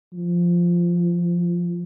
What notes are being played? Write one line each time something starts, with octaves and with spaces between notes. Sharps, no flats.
F3